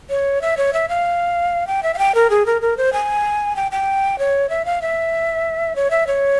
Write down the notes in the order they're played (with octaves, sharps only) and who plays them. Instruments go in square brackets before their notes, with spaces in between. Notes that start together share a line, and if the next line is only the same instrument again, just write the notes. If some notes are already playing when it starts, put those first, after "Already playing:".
[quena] C#5
E5
C#5
E5
F5
G5
E5
F5
G5
A#4
G#4
A#4
A#4
C5
G#5
G5
G5
C#5
E5
F5
E5
C#5
E5
C#5